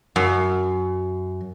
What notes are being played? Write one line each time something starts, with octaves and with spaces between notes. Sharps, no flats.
F#2